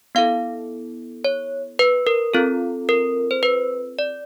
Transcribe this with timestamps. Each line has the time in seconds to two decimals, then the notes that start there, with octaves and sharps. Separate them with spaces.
0.15 B3 E4 A4 F5
1.25 C#5
1.79 B4
2.07 A#4
2.34 C4 F4 A4
2.89 A#4
3.31 C5
3.43 B4
3.99 D5